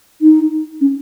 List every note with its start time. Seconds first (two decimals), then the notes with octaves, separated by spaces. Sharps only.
0.22 D#4
0.81 C#4